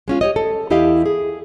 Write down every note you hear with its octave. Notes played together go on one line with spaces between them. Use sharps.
G#3 C#4 F4
G4 C#5 D#5
A4
E2 E4 G4 D#5 F5 G5
G#4